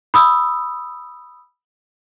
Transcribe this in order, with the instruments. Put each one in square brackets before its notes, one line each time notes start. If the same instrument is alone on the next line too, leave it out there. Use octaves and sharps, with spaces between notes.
[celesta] B5 D#6 E6